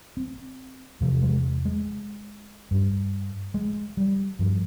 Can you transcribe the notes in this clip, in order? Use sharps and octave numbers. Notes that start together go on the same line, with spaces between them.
C4
E2 C3 F3
G#3
G#3
G2
G#3
G3
G2 F3